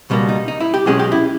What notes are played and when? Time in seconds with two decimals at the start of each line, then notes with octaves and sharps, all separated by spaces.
0.10 C#2 B2 G3 A#3
0.29 D#4
0.48 D#4
0.60 E4
0.74 G4
0.86 B1 B2 G#3 C#4 G#4
0.99 G4
1.12 E4